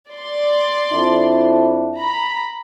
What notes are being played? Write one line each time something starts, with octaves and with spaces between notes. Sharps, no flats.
D5 C6
F2 D4 E4
A#5 B5